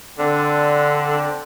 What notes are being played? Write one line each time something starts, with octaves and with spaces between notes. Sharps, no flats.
D3 C4 D4